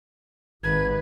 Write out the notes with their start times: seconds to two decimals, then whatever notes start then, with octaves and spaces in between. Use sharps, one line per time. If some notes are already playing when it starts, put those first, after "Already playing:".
0.64 G#1 B4 G#6